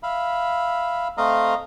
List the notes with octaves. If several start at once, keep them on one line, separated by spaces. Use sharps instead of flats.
E5 F5 B5
A3 C4 D#5 F5 A#5